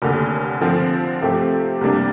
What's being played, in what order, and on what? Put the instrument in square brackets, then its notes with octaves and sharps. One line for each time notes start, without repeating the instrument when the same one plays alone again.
[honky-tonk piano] F1 D#2 D3
D3 F3 C4
C3 F3 A3 C4 G4
C2 C3 G3 A#3 D4